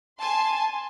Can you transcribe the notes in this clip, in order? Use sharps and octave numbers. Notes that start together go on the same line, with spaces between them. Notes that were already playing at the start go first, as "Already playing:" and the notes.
G#5 A5 C6